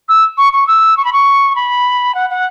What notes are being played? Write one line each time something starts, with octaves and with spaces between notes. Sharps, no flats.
E6
C#6
C#6
E6
C#6
B5
C#6
B5
F#5
F#5